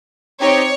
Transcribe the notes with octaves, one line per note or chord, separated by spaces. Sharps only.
C4 D#4 G4 C#5